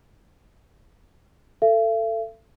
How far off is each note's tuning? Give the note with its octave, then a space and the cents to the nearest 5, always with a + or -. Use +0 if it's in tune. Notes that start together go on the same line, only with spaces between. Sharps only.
A4 +15 E5 +45